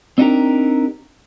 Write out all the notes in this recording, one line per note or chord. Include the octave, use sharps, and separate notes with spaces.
C4 D4 D#4 F#4 G4 A#4